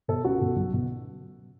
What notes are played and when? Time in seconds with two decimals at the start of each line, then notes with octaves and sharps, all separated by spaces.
0.08 B2 A4
0.24 C#2 F#4
0.41 B2
0.56 B1
0.73 B2